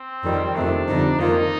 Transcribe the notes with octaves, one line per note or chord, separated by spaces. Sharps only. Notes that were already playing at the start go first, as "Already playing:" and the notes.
Already playing: C4
F2 D#3 G3
F2 C3 D#3 A3 D4
F2 D3 G3 C4 D#4
F2 D#3 A#3 D#4 F4